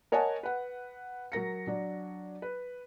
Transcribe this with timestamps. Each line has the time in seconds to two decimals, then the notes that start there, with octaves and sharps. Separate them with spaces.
0.12 A#4 C#5 D#5 F#5 G#5 A5
0.43 B4 F#5
1.32 F#3 A#4 A#6 C#7
1.67 F#3 D4
2.42 B4